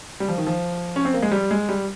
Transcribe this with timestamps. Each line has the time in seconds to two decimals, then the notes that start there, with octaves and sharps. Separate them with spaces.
0.20 G3
0.28 F3
0.38 D#3
0.47 F3
0.96 C#4
1.05 C4
1.14 A#3
1.22 G#3
1.31 G3
1.51 G#3
1.69 G3